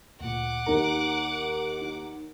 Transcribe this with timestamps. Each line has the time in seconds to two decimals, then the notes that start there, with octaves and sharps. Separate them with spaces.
0.21 D2 A#2 F#5 D6
0.67 D#2 D#3 A#4 A#5
1.82 D#4